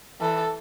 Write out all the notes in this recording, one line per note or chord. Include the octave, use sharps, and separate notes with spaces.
E3 A4